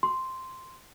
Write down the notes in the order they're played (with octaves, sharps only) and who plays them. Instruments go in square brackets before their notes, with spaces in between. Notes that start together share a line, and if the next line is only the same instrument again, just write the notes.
[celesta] C6